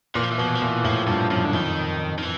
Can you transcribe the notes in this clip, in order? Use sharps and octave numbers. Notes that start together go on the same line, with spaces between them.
A#2 E3
F3
E3
B2 F3
E3
F3
A#2 E3
A2 F3
G2 F3
F#2 F3
D3
F2 D#3
D#3
E3